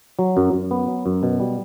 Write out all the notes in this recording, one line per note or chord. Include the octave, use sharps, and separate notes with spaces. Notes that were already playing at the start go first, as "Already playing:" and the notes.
F#3
F#2
F#2
B3
F#3
F#2
B2
G3